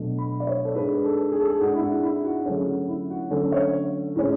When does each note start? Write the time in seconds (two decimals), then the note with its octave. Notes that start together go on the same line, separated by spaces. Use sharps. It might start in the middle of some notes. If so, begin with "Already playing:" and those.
Already playing: B2 F#3 A3 D4
0.18 B5
0.40 D5
0.47 C#5
0.65 A4
0.75 G#2 G#3 D4 B4
1.04 A4
1.32 G#4
1.40 A4
1.48 G#4
1.61 G#2 G#3 D4 F#4
1.75 E4
1.81 F#4
2.03 E4
2.25 F#4
2.46 D3 F#3 A3 C#4 G#4
2.67 F#4
2.88 E4
3.10 F#4
3.31 D3 F#3 A3 C#4 A4
3.52 C#5
4.16 A2 G#3 C#4